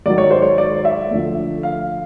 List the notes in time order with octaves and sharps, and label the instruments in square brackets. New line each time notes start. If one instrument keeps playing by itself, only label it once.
[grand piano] G#2 D#3 F#3 D5
C#5
C5
C#5
D5
E5
D2 D3 F3
F5